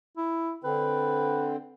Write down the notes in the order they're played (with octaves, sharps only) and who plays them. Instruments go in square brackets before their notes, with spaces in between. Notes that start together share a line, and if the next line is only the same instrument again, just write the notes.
[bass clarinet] E4
[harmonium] D3 C4 [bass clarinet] B4